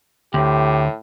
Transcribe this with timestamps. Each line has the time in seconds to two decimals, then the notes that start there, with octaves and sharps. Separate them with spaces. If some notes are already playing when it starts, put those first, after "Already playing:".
0.34 D2 A2 G4